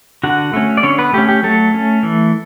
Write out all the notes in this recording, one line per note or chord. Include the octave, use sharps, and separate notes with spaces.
D3 F#4 F#5
A3 C#4
D5
D3 C#4 C#5
B3 B4
A3 C#4 G4
G4
F#3 A3 A4
C#4
E3